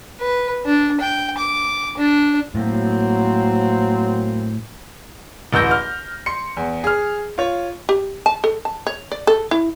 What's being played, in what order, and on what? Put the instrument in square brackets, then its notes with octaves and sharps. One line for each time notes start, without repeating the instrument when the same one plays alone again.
[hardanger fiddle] B4
D4
G5
D6
D4
[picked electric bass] A2 [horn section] F#3 A#3 C4
[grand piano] D1 A1 E6 G6 A#6
F6
C6 C#7
E2
G#4 F6
F4 C#5
[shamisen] G4
A5
A4
A5
C#5
D5
A4
E4